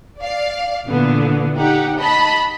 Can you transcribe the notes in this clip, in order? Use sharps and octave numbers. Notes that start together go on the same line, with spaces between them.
D5 F5
A#2 D3 E3 B3
D#4 G4 F#5
D#5 A5 B5